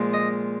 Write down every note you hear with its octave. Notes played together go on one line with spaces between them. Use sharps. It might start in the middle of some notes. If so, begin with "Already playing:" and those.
Already playing: A#2 F3 G#3
D#5